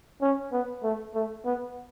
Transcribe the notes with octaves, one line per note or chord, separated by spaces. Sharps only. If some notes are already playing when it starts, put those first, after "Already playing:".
C#4
B3
A3
A3
B3